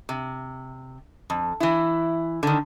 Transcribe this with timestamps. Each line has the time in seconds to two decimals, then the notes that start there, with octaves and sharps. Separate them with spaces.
0.09 C3
1.30 F2
1.60 E3 E4
2.43 D3 D#3